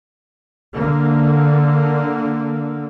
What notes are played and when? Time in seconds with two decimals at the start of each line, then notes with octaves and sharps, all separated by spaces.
0.76 D3 A#3